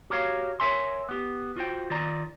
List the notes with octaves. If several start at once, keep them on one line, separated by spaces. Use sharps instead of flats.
F#4 G4 A#4 C#5 F5
A#4 C#5 E5 G#5 C6
B3 G4
F4 F#4 C5 G5
D#3 F4 D5 A#5